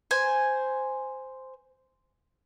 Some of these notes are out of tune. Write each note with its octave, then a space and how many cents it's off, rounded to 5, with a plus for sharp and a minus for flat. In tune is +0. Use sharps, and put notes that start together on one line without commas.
C5 -5 G#5 +0